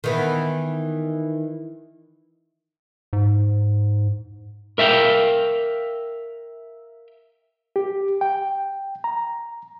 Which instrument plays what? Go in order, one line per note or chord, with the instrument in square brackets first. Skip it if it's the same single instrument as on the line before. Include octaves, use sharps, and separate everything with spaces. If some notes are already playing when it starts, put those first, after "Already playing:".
[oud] D#3 E3 B3
[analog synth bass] G#2
[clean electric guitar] A#4 E5 F5 G5
[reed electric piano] G4
G5
A#5